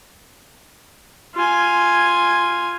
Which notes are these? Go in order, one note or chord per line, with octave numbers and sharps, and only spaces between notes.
F4 G#5